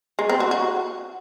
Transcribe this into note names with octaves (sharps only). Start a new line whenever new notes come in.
G#3
C4
F#4
F#4